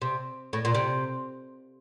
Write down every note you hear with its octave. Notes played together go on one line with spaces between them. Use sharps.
C3
A2
A#2
C3